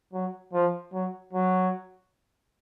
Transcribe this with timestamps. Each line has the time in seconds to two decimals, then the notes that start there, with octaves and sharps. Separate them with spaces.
0.13 F#3
0.54 F3
0.93 F#3
1.33 F#3